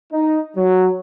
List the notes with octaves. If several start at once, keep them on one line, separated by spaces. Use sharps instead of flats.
D#4
F#3